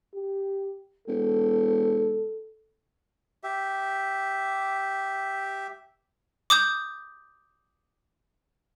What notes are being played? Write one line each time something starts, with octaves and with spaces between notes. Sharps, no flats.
G4
E1 A4
G4 E5
D6 D#6 G6